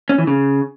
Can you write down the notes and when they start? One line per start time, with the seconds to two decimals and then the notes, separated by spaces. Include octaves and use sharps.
0.09 C#4
0.18 E3
0.27 C#3